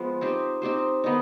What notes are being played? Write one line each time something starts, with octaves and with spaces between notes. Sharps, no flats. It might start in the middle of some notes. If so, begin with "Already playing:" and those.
Already playing: F3 G#3 B3 F4
C4 D#4 G4 C5
C4 D#4 G4 C5
D#3 B3 D#4